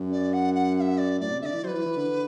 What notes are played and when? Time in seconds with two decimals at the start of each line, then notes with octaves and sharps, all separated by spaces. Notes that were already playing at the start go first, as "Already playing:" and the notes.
Already playing: F#2
0.11 D5
0.33 F#5
0.54 F#5
0.75 F#5
0.80 E5
0.97 D5
1.20 A2 D5
1.30 C3
1.41 D3 D5 E5
1.53 E3
1.63 F#3 B4 C5
1.74 E3
1.86 E3
1.96 D3